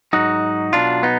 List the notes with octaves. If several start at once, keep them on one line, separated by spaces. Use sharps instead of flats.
G#2 F#3 D#4 F#4
B1 B2 F#3 D4 F4
B3 D#4